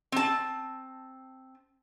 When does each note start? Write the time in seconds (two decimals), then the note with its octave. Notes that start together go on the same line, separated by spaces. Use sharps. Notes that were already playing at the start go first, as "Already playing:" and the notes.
0.12 C4 A5